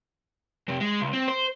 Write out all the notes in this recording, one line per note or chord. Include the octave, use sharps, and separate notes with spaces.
F2 C3
G#3
C#2
C4
C5